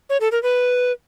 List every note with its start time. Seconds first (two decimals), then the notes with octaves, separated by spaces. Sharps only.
0.10 C#5
0.21 A4
0.32 A#4
0.43 B4